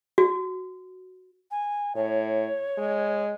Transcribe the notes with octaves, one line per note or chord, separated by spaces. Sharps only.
F#4
G#5
A2 C#5
G#3